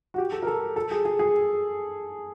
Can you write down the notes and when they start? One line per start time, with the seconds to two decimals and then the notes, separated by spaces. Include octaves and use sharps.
0.14 F#4
0.18 G4
0.32 A4
0.43 A#4
0.47 A4
0.76 A4
0.91 G#4
1.05 G#4
1.19 G#4